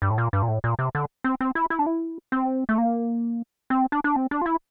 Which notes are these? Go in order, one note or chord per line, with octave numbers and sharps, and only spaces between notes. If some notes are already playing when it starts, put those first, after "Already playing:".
G2
A2
A#2
G2
A#2
A2
A#2
C3
D3
C4
C4
E4
E4
D4
E4
C4
A3
A#3
C4
D4
D4
C4
D4
F4
E4